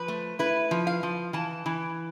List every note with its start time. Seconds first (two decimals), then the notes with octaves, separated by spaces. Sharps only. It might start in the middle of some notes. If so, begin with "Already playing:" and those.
Already playing: F3 B4
0.08 A3
0.39 E4 B4
0.71 F3
0.87 F5
1.03 F3
1.33 E3 A5
1.66 E3